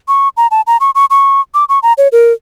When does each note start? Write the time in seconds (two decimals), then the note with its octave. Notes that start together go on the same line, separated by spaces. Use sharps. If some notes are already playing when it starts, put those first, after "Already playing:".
0.08 C#6
0.37 A#5
0.51 A5
0.67 A#5
0.80 C#6
0.95 C#6
1.10 C#6
1.54 D6
1.69 C#6
1.83 A#5
1.98 C#5
2.12 A#4